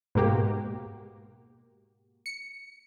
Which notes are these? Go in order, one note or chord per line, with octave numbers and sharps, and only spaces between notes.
G#2 B2 G#3 A#3 F#4 G4
C#7